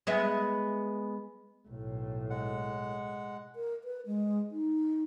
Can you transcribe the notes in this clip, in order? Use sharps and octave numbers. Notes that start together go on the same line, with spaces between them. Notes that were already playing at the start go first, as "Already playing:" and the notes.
G#3 B3 E5
B1 A2
G#3 F#5
A#4
B4
G#3
D#4